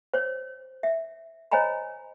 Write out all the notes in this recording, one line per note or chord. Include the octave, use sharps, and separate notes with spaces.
C5 C#5
E5
C5 C#5 D#5 G#5 A#5 B5